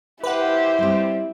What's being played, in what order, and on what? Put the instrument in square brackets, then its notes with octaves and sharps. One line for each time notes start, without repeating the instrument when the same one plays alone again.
[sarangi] E4 [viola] G4 C5 [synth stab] B4 F#5
[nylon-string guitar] G3 C4